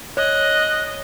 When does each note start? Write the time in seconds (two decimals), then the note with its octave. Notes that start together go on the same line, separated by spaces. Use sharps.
0.17 C#5 D#5 F#6